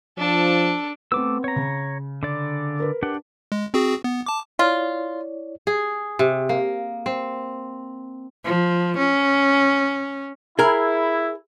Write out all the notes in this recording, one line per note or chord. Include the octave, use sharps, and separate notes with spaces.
F3 D4 A4
A3 B3 C4 D6 E6
C#5 A#5
C#3
D3 D5
A#4 B4
D4 G4 F#5
G#3
C4 F#4 G#4
B3
A5 D6
E4 F4 C#5 D5
G#4
C3
A#3
C4
F3
C#4
E4 G#4 A#4